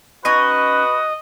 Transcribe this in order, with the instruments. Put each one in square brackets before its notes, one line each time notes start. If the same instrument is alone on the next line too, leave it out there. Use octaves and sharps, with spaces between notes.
[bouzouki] C#4 D#4 G#5 [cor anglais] F#4 [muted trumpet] B4 [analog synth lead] D#5